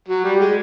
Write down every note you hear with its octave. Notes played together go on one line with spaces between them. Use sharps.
F#3
G3
G#3